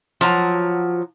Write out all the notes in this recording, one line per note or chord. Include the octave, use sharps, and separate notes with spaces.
F3 F#3 A#5